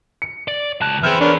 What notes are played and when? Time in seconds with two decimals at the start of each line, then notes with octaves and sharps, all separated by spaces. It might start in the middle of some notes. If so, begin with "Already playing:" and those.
0.22 C#7
0.48 D5
0.82 C#2 A5 F#6
1.03 E3 B3 C4 G#4 E5 F6 G6
1.20 B3 C#4 D4 A#4